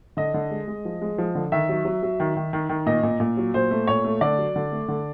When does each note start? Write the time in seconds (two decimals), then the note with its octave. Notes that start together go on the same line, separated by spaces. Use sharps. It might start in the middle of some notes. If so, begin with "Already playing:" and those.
0.17 D3 D#5
0.34 D3
0.51 G#3
0.68 G#3
0.85 F3
1.01 G#3
1.18 F3
1.35 D3
1.52 D#3 E5
1.69 F#3
1.85 F#3
2.03 F#3
2.20 D#3
2.37 D#3
2.53 D#3
2.69 D#3
2.86 A#2 D#5
3.03 A#2
3.20 A#2
3.37 F#3
3.54 A#2 C5
3.71 A3
3.87 A#2 C#5
4.04 A3
4.21 D3 D5
4.38 F#3
4.56 D3
4.72 A3
4.88 D3